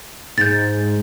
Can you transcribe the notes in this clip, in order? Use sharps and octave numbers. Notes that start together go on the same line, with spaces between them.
G#2 G6 A6